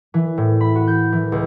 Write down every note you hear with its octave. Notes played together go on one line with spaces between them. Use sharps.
E3
A2
B5
F#4
G6
E3
C#2